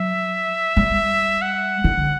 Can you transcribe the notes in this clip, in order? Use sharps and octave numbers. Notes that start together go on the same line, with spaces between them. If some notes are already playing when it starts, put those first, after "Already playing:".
Already playing: F#3 E5
G3
F#5
D3